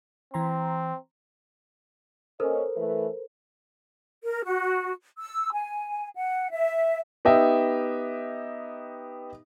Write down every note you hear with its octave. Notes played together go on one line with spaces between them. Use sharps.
E3 C4 A#5 C6
A#3 C#4 A4 A#4 C5 D#5
E3 A3 B4
A#4
F#4
E6
G#5
F#5
E5
B3 D#4 G4 D#5 E5